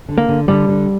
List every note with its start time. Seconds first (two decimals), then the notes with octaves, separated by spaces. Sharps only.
0.08 D3
0.18 A#3
0.28 D3
0.48 D3 G3
0.69 D3